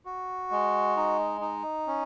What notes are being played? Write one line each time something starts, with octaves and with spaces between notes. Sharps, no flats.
F#4
G#3
D#4
D#4
C#4